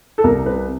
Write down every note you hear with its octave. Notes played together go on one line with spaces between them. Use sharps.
A4
C2 A#4
C3 B4